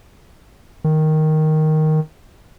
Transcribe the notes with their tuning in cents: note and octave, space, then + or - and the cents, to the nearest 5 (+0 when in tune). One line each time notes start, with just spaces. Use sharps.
D#3 +0